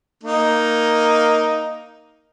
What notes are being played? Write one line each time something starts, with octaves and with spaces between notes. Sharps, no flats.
A#3 D#4